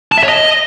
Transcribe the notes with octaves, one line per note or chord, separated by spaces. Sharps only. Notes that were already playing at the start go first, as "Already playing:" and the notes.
A5
E5
C#5
D#5